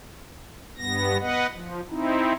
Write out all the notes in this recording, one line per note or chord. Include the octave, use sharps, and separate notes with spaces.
G2 B3 A#6
B3 B4 D#5 F#5
F3
C4 D#4 E4